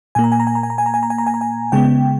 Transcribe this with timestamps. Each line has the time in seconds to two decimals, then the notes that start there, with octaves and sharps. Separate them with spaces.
0.15 A#2 A#3 G#5
0.24 A#5
0.32 G#5
0.40 A#5
0.47 G#5
0.55 A#5
0.63 G#5
0.70 A#5
0.78 G#5
0.86 A#5
0.94 G#5
1.03 A#5
1.10 G#5
1.18 A#5
1.27 G#5
1.34 A#5
1.41 G#5
1.72 C#3 G#3 B3 G5